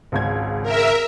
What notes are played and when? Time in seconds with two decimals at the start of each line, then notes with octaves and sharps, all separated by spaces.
0.12 G#1 C#2 G#6
0.63 A#4 E5